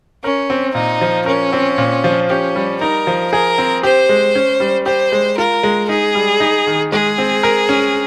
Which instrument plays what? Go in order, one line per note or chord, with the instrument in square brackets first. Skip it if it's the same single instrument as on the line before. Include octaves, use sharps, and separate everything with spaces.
[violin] C#4 [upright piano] A#4
[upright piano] C4
[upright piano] A#2 [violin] D#4
[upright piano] F3
[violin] C#4 [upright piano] A#4
[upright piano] C4
A#2
F3
[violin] C#4 [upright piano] G4
[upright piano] G3
[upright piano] D#4 [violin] A#4
[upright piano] F3
[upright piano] G#4 [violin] A#4
[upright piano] C4
[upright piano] G4 [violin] C5
[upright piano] G#3
C#4
G3
[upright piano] G4 [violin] C5
[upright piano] G#3
[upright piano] F4 [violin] A#4
[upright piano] G#3
[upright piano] D#4 [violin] G#4
[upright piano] G3
D#4
D#3
[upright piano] G#3 [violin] G#4
[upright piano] C4
A#4
C#4